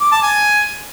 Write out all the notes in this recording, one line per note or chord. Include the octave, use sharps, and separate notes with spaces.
D6
A5
G#5